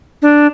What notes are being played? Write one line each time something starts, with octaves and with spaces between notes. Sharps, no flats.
D4